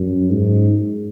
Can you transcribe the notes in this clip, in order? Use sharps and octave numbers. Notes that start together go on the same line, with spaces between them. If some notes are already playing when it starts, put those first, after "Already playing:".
Already playing: F#2
G#2